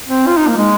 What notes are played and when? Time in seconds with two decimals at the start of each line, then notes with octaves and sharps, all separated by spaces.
0.09 C4
0.27 F4
0.37 D#4
0.47 A#3
0.57 G#3